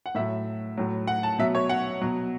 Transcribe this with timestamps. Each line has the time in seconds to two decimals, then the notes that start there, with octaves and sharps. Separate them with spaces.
0.06 F#5
0.15 A2 F#3 E5
0.78 A2 F#3
1.07 F#5
1.23 A5
1.38 B2 F#3 E5
1.55 C#5
1.69 F#5
2.01 B2 F#3